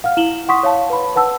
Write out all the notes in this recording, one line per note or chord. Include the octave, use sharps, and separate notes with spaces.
F5 F#5 F6
E4 E7 F#7 G7
F#5 C6 C#6 D#6 B6
C#5 F5 A5
B4 B5
B4 F#5 A5 E6